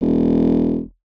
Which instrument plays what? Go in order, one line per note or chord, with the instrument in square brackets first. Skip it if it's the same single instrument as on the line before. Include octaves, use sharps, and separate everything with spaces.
[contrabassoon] E1